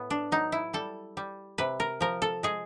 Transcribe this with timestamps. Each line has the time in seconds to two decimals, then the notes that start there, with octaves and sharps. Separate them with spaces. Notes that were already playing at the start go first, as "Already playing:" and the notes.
Already playing: A2 B3
0.10 D4
0.32 F#3 D#4
0.52 E4
0.73 G3 A4
1.17 G3
1.58 C3 B4
1.80 A#4
2.01 F3 A#4
2.22 A4
2.43 G#3 G#4